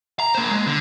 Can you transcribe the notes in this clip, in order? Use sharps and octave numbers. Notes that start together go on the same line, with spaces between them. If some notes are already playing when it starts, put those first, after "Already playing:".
A#5
A#3 C5
G#3
D3